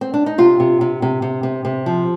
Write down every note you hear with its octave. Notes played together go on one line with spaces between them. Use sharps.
C4
D4
D#4
C3 F4
C3
C3
C3
C3
C3
C3
F3